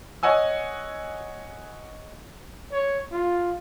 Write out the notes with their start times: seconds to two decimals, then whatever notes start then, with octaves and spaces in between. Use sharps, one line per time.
0.23 C#5 D#5 F#5 G#5 E6
2.72 C#5
3.12 F4